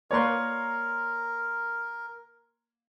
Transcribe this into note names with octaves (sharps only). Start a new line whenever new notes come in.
A#3 A#4 B4 C#5 D5 A#5 C6